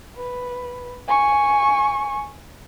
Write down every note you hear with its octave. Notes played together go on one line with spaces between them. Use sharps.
B4
G#5 C#6